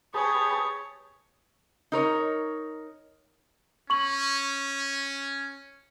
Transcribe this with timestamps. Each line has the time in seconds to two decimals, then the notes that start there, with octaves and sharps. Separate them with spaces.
0.14 G4 G#4 B4 C#5 A5 D#6
1.92 D#4 A#4 C#5
3.90 C#4 C#6 F#7